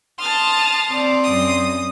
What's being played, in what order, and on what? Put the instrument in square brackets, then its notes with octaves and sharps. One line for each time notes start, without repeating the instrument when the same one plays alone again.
[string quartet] A5 D#6 F6 [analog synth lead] C6
[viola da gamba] C4 D5
[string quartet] F#2 D#6